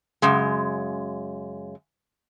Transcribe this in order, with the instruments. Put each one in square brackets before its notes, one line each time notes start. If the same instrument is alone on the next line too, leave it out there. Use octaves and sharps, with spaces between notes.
[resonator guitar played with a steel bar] F#2 C#3 G#3